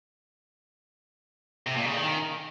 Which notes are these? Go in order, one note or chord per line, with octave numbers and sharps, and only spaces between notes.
C3
A#2
C#3
D#3